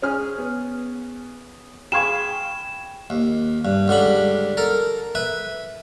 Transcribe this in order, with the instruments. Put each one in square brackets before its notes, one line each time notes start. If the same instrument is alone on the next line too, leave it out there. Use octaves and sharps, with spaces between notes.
[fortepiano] C#4 G#4 F6
[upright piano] B3
[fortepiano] G#4 F5 C#6 [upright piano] G5 B5 G#6 [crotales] E7
[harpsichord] D#2
G2
C#2 D3 G3 B5
A4 A#4
B4 E5